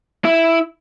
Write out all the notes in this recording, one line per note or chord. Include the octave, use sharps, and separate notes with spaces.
E4